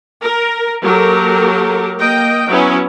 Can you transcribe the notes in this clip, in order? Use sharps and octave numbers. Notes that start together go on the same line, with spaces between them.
A#4
F#3 A#3 G4 A4 A#4
A#3 D#5 G5
F#3 B3 C#4 E4